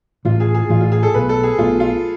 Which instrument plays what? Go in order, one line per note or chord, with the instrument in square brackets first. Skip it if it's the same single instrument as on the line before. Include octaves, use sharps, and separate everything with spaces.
[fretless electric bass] A1 A2 E3 [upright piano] F4
[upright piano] G#4
G#4
[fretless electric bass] A1 A2 E3 [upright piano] F4
[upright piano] F4
G#4
A4
[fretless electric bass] B1 B2 A3 [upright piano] B4
[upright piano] A4
G#4
[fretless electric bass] B1 B2 A3 [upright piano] F4
[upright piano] F4